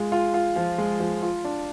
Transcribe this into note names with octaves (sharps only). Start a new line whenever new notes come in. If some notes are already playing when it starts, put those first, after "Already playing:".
Already playing: G#3 F4
F4
F4
F3
G#3
F3
F4
D4